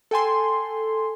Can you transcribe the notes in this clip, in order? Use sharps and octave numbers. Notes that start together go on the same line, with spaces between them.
A4 G5 G#5 C6